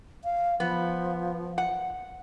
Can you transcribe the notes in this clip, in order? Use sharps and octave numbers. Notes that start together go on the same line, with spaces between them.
F5
F3 B3
F#5